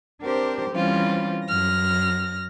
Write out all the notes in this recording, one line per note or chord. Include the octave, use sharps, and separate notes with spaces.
C4 D4 G4 A#4 C5
E3 G3 C4 C#4 F4
F#2 F6 A#6